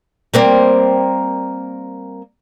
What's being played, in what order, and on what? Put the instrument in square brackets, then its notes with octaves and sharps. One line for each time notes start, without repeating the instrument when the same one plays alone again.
[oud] G3 A#3 C4